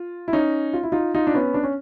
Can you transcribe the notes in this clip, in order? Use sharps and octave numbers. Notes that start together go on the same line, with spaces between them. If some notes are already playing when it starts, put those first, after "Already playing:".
Already playing: F4
E4
C#4 D#4
F4
E4
D#4 F4
D#4 F4
D4
B3 C#4
D4
C#4